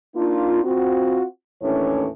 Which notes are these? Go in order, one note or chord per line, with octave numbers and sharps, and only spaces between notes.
A#3 D4 D#4 F4
C4 F4 F#4
D#2 A2 E3 C#4 D4 C#5